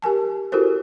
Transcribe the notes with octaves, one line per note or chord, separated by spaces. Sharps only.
G4 A#4 G#5 A5
E4 F#4 G4 A4 A#4 C5